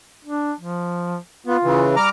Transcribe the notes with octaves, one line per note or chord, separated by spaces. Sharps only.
D4
F3
B3 F4
C#3 E3
G3 A#5 D6 F6